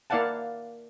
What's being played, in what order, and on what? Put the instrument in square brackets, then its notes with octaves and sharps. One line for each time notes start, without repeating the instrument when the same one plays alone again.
[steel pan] A#3 E4 D5 F5 F#5 A5